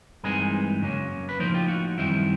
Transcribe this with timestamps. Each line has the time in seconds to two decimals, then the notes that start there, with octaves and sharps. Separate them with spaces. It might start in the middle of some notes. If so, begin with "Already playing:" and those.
0.23 G2 E3 G#3 C4 D#4 G#4 A#4
0.81 F#2 C#3 F#3 A#3 C#4
1.29 B4
1.39 A2 F3 A#3 D#4 A#4 C5
1.54 F4 G4
1.68 F#4
1.98 F#2 D#3 G3 C4 E4